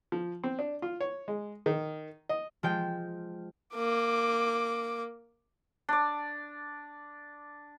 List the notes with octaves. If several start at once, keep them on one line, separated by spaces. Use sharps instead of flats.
F3
C4
D4
F4
C#5
G#3
D#3
D#5
F3 G#3 G5
A#3 D6
D4 D5